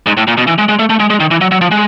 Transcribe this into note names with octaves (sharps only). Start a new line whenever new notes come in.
G#2
A2
A#2
B2
E3
G#3
G#3
A3
A3
G#3
G#3
D#3
E3
F#3
F#3
F3
G#3